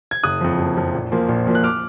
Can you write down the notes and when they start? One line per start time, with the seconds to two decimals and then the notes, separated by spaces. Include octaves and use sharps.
0.11 G#6
0.23 F#1 D#6 F#6
0.41 F2 F3
0.59 F#1
0.77 F2 F3
0.95 A#1
1.12 A#2 F3 A#3
1.29 A#1
1.47 A#2 F3 A#3
1.55 F#6
1.64 D6 F6